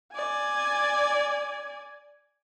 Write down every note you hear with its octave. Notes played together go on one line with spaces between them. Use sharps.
D5 G#5